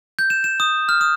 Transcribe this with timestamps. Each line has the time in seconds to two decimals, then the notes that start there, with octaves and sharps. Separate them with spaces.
0.19 G6
0.30 E7
0.44 E7
0.60 D#6
0.89 F6
1.01 D#6